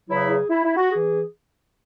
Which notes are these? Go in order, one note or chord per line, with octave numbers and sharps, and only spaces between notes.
E2 C#3 F#3 E4
G#4
E4
E4
F#4
E3 G#4